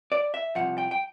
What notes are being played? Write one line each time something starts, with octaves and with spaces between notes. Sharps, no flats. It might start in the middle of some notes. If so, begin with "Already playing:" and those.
D5
E5
C2 C3 F3 F#5
G5
G5